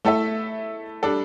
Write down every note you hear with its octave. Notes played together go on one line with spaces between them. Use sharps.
A3 E4 A4 E5
G3 D4 A4